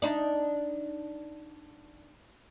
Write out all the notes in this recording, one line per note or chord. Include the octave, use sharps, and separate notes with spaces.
D4 D#4 D5